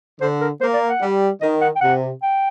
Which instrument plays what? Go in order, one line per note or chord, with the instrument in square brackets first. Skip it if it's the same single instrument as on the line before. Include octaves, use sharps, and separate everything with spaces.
[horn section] D3 [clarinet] C5
[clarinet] A#4
[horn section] A#3 [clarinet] C5
[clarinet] D5
F#5
[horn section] G3
[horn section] D#3 [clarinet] D#5
[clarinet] F#5
G5
[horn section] C3 [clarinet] F#5
[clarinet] G5